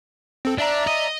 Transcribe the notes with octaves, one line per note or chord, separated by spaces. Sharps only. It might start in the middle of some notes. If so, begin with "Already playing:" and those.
C4 A4
D4 D5 E5 A#5
D#5